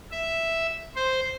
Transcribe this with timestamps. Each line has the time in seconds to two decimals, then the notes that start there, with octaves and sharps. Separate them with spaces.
0.11 E5
0.96 C5